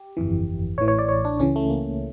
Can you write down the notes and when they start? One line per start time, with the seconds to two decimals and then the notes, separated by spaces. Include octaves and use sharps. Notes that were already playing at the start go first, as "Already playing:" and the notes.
Already playing: G4
0.17 G1 F2 E3
0.78 A1 A2 E3 C#5
0.88 C#5
0.98 D5
1.09 C#5
1.25 D4
1.39 C#2 C#3 E3 C#4
1.56 A3
1.70 A#3